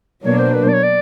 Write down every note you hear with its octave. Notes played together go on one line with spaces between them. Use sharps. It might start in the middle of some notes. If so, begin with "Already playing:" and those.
B2 F#3 A#3 D4 C#5
C5
B4
C5
D5
C#5
D5